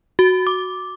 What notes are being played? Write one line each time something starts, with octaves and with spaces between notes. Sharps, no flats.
F#4
D6